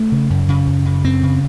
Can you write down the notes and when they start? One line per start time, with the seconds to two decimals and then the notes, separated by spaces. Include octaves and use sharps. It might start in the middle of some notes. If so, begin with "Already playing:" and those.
Already playing: A3
0.12 C#3
0.30 F#2
0.49 C#3
0.67 F#2
0.85 C#3
1.04 F#2 C4
1.23 C#3